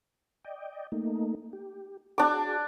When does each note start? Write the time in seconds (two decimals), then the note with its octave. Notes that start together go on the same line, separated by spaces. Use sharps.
0.45 D5 D#5 G5
0.92 A3 A#3 D#4
1.53 G4
2.18 D4 F#4 G#4 D6